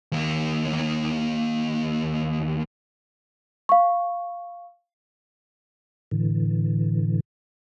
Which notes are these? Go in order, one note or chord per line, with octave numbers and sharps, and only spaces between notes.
D#2 A#3
F5 C#6
A2 D3 E3